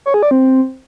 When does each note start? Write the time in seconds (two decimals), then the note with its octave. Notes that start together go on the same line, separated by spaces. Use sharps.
0.06 C#5
0.14 G#4
0.23 D5
0.31 C4